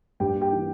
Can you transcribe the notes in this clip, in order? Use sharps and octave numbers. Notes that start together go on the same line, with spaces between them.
G2 G4 G5
A#3
G4 G5
E3